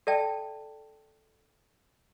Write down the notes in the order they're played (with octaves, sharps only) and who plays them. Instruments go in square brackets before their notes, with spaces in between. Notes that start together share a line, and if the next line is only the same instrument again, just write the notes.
[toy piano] A4 D5 E5 G5 A5